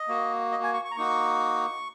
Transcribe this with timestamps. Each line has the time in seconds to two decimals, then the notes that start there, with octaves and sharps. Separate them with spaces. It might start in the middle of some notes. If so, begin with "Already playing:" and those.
Already playing: D#5
0.08 A#3 F#4
0.51 D#5
0.63 G#5
0.74 C#6
0.85 C#6
0.91 A#5
0.96 A#3 D#4 F#4 C#6